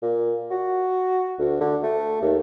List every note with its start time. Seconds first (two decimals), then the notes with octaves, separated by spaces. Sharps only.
0.02 A#2
0.51 F#4
1.39 D2
1.61 D3
1.83 A3
2.22 D#2